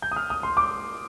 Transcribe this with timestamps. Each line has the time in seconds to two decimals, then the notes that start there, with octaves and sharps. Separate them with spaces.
0.02 G6
0.12 D#6
0.16 F6
0.30 D#6
0.43 C6
0.57 D6